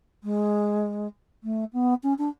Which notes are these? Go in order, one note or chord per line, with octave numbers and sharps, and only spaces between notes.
G#3
A3
B3
C#4
D4